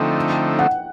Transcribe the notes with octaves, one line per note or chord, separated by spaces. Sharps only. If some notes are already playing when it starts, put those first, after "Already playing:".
Already playing: D3 F3 A3 C4 D#4 G5
F#5